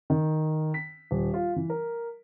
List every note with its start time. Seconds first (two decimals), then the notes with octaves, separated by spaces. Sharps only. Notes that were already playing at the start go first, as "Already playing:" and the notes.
0.10 D#3
0.74 B6
1.11 D#1
1.34 F4
1.56 E3
1.70 A#4